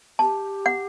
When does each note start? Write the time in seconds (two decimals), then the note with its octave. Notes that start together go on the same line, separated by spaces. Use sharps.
0.19 G4 A5
0.66 F#5